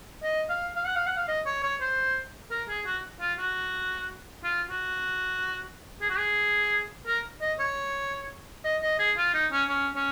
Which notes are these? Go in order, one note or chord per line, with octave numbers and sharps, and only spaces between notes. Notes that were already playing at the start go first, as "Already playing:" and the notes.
D#5
F5
F5
F#5
F5
F#5
F5
D#5
C#5
C#5
C5
A#4
G#4
F#4
F4
F#4
F4
F#4
G#4
F#4
G#4
A#4
D#5
C#5
D#5
D#5
G#4
F4
D#4
C#4
C#4
C#4